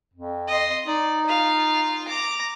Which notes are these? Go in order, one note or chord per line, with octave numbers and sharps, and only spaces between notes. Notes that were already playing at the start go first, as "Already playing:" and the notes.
F2
D#5 C6
D#4 D5
F4 F5
A#5 D6